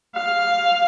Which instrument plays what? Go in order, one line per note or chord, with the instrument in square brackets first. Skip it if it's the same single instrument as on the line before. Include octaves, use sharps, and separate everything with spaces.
[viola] F5